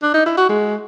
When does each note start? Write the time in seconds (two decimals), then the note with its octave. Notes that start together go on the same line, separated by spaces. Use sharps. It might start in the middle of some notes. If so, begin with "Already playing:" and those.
0.02 D4
0.14 D#4
0.26 E4
0.37 F#4
0.49 G#3